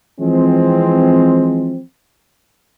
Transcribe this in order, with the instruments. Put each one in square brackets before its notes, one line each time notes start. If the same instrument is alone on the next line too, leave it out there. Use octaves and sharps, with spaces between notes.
[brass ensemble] E3 F3 G#3 C4